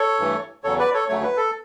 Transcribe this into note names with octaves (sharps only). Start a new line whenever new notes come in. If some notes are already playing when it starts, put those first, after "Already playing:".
Already playing: A4 C#5
G2 E3 A3
E2 C#3 F#3 A4 C#5
B4 D5
A4 C#5
D2 C#3 F#3 A3 C#5
B4
A4